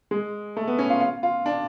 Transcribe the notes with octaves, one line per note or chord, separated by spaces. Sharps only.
G#3
A3
B3
C#4
F4
F4
F4
D4